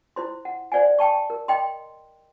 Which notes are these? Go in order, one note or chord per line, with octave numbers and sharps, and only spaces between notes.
E4 C5 C6
F#5
C5 D5 F#5 G#5
G5 A5 C#6
A#4
D#5 G5 C6